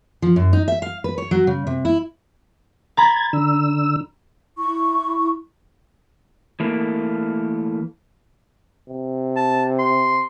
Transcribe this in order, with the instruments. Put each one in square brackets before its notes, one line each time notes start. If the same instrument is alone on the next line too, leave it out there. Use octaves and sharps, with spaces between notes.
[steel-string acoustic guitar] F3
F#2
D#4
E5
F5
B4
C#5
F#3
C#3
C3
E4
[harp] A#5 B5 [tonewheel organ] G#6 A6
[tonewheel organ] D3 E6
[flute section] E4 C#6
[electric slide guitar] E3 A3 A#3
[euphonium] C3
[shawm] A5
C6